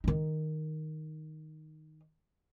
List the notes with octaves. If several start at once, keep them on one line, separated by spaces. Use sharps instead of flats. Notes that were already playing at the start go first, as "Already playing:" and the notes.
D#3 D#4